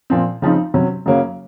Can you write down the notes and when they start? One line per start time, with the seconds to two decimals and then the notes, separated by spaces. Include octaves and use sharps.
0.10 A#2 F3 C4
0.42 C#3 F3 C4 D#4
0.74 C3 F#3 C#4
1.06 F#2 C#3 F#3 A#3 C#4